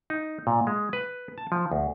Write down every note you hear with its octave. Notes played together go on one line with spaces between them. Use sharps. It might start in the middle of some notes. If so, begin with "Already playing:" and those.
D#4
A#2
G#3
B4
A5
F3
D2